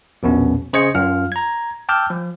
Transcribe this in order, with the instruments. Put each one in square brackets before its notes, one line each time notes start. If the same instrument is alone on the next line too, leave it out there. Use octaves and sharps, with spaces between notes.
[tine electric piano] A#1 E2 B2 B3 C#4
C#3 C5 D#5 G#6 C#7
F#2 F4 F5 F6
A#5 G#6
G5 A5 D6 E6 F6 G6
F3